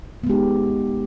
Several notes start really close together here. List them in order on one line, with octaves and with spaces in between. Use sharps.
B3 G#3 G4 D#4